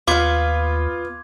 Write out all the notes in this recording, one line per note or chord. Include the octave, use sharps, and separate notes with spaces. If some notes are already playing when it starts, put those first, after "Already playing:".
D#2 B3 F4 F5 C6 D6 G#6